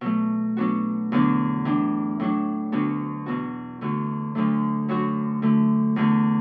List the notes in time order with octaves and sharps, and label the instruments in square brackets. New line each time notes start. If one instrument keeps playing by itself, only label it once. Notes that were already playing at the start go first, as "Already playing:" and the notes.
[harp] B2 F#3 A3
B2 F#3 B3 D4 F#4
E2 D3 F#3 B3 D4
A2 E3 D4
A2 F#3 D4
D2 D3 B3 D4 F#4
E2 B2 B3 F#4
E2 D3 A3 F#4
D2 D3 F#3 A3 D4
F#2 F#3 D4 F#4
D3 A3 E4
E2 D3 A3